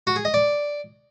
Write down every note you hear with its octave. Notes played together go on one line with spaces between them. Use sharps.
F#4
G#4
D#5
D5